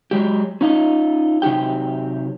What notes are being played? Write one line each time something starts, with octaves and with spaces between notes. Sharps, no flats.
F#3 G#3 G4
C#4 D#4 F4 D#5
C3 F#3 D#4 G4 G5